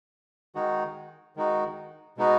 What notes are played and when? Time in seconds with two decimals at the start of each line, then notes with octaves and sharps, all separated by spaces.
0.55 D#3 G#3 D#4 F#4
1.36 D#3 G#3 D#4 F#4
2.17 B2 G#3 B3 D#4 F#4